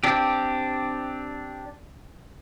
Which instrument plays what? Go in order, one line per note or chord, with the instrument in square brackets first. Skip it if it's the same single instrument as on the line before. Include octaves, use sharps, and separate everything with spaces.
[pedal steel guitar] C4 D4 G4